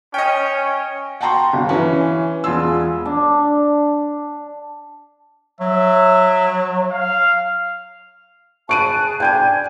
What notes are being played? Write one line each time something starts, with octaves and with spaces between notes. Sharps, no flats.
C#4 D#5 G5
F#5 G5 A5 A#5 C6 C#6
G1
E3 C#4
E1 F4 G#5 C6 E6
D4
F#3 E5
F5
G#4 A5 C#6 F#6 D7 D#7
D4 G5 G#5 G6 G#6 D#7
C#4